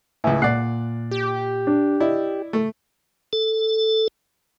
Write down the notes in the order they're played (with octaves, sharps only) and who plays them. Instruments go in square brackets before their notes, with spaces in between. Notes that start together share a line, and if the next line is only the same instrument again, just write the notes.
[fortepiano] C#2 A2 [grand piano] B4 E5 G#5
[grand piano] A#2 F#5 C7 [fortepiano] D5 F#6
[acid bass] G4
[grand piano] D4
[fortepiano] E4 [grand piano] D5 D#5
[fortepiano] A3
[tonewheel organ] A4